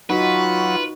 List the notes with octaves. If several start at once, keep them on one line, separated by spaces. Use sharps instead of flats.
F#3 D#4 F4 F#4 B4